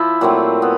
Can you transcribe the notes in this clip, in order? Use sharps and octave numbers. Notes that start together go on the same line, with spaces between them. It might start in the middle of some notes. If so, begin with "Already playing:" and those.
Already playing: F3 E4
A#2 F#3 A3 C4
B3